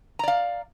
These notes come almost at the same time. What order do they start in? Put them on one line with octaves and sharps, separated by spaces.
A#5 D5 F5